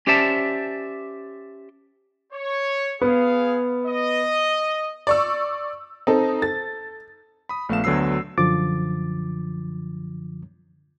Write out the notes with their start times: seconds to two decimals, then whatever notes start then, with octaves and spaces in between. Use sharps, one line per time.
0.07 C#4 G4 C5 D5 E5 A5
2.33 C#5
3.01 B3 G#4 F5
3.86 D#5
5.07 D5 C#6 E6
6.07 C4 D#4 A4
6.42 A4 A6
7.49 B5 D#6
7.69 A#1 A3 B3 F5 E7
7.84 D2 D3 F#3 B3 E6 C7
8.38 F#2 D3 F3 D6 A6